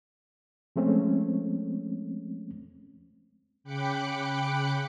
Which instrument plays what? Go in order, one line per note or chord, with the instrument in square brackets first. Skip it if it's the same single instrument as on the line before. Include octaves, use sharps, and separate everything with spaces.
[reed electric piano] F3 G#3 A3 C4 C#4
[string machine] C#3 G5 B5 D6 F#6 C#7